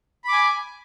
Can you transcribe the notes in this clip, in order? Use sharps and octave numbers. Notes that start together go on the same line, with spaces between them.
G#5 B5 D6